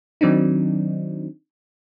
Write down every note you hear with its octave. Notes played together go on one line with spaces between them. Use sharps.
D#3 F#3 C4 D4 D#4